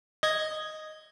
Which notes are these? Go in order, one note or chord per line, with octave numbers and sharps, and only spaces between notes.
D#5 G#6